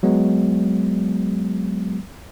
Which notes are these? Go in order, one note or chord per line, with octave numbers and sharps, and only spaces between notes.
F#3 G#3 B3